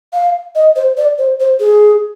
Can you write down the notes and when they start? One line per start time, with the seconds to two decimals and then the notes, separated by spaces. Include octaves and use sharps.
0.13 F5
0.55 D#5
0.76 C5
0.97 D5
1.18 C5
1.40 C5
1.60 G#4